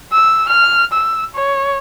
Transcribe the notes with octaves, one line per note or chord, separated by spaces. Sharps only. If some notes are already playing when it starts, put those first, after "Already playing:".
E6
F6
E6
C#5